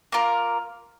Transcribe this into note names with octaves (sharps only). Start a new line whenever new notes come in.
A#3 F4 A#4